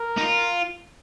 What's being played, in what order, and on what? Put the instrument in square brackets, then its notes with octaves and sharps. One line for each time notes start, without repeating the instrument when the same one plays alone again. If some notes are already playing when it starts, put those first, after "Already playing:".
Already playing: [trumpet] A#4
[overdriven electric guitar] D#4
F4